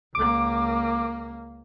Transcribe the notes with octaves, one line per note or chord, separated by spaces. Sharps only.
C#2 A#3 D6